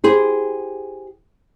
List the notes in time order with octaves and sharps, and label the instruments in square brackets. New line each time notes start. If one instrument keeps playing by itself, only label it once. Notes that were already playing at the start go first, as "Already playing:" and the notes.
[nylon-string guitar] G4 G#4 C5